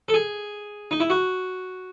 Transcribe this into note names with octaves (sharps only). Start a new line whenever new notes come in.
A4
G#4
D#4
E4
F#4